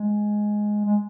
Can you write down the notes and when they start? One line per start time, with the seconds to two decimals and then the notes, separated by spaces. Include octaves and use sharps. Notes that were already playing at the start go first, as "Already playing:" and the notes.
Already playing: G#3
0.85 G#3